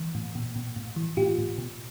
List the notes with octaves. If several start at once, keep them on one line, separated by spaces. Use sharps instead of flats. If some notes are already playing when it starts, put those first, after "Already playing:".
Already playing: E3
A2
A#2
A#2
A2
E3
A2 F4 G4
A2
B2